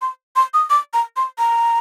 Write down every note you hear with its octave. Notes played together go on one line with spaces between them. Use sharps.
C6
C6
D#6
D6
A#5
C6
A#5